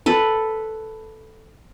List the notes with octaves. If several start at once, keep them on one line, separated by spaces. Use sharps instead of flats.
A4 B4